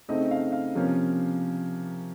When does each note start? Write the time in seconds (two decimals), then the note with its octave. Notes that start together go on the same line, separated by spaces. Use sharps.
0.09 C#3 A3 C4 D#4 D#5
0.31 F5
0.52 F5
0.75 C3 F3 A#3 C#4